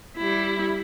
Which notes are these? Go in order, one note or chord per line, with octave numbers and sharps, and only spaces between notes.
G3 E4